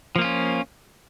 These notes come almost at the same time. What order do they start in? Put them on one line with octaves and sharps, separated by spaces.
F3 A#3 F4 C#4